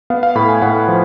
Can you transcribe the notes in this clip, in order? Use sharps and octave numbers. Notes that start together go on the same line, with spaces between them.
B3 F5
F5
A2 B5
G#5
A2 F#5
F3